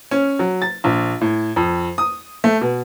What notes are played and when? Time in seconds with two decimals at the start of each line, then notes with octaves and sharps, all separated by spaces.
0.11 C#4
0.39 F#3
0.62 A6
0.84 A#1
1.21 A2
1.56 F2
1.98 D#6
2.44 A3
2.61 B2